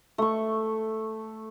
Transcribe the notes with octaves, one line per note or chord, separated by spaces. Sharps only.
A3 C#6